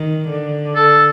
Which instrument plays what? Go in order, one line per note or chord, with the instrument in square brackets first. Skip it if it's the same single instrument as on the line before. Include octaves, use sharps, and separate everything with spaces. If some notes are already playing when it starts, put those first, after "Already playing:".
Already playing: [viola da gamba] D#3
D3
[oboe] A4